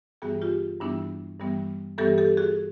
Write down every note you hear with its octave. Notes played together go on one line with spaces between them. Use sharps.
G2 E3 G3 B3 F#4 G#4
F4 G4
G2 E3 G3 B3 D4 E4
G2 E3 G3 B3
G2 E3 G3 B3 G4 A4
G4 A4
F#4 G#4